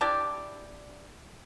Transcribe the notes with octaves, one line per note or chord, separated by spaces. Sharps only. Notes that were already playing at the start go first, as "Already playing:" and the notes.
D4 E4 G4 D5